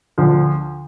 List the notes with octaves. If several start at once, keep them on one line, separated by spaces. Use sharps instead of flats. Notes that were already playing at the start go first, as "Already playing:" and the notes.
D2 D3 F3